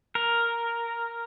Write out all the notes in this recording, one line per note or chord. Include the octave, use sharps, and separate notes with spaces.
A#4